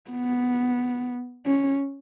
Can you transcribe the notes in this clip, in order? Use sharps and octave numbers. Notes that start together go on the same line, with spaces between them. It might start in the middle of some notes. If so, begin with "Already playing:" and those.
B3
C#4